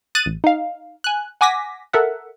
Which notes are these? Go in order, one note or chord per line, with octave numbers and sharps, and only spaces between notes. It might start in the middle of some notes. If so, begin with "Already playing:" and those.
D#6 F#6 A6 D#7
A1
D#4 F5
G#5 F#6
F#5 G#5 D6 A#6 B6
A4 A#4 E5 F#5